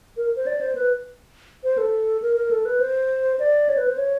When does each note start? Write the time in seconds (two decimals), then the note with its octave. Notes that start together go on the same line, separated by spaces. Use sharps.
0.17 A#4
0.36 C5
0.47 D5
0.61 C5
0.75 B4
1.64 C5
1.78 A4
2.22 A#4
2.37 A#4
2.51 A4
2.65 B4
2.80 C5
3.39 D5
3.69 C#5
3.77 B4
3.88 C5
3.97 C#5